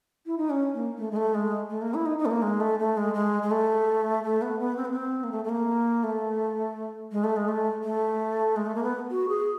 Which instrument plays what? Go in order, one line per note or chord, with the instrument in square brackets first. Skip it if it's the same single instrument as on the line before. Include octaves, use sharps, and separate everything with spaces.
[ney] E4
D#4
C#4
A#3
A3
G#3
A3
G#3
A3
A#3
E4
D#4
D#4
A3
A#3
G#3
A3
A3
G#3
G#3
G#3
A3
A3
B3
B3
C4
B3
C4
A#3
A3
A3
A#3
A3
G#3
A3
G#3
A3
A3
G#3
A3
A#3
B3
F#4
G#4